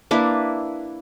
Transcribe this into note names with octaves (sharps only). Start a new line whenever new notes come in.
A#3 D4 E4 B4